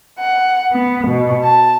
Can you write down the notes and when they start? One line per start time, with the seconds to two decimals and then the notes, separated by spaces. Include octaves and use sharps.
0.19 F#5
0.72 B3
1.07 B2
1.44 A5